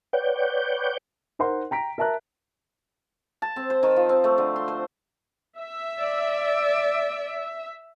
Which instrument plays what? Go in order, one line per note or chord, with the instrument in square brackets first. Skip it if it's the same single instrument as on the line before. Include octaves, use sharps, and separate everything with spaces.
[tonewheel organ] B4 C#5 D5 F#5 G5 G6
[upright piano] D#4 A#4 C5 F#5 C6
G5 A#5 B6 D7
A#4 E5 A5 A#5 F#6
[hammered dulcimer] A5
C4
C5
D#3
F3
C4
A3
D3
C6
C5
[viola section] E5
[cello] D5